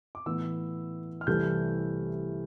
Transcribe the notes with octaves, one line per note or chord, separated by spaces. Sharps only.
D6
A2 E3 B3 E4 E6
F6
C2 C3 E3 A3 G6